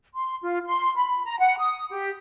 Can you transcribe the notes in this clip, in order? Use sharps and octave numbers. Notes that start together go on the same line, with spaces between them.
C6
F4
C6
B5
A#5
F#5
D#6
G4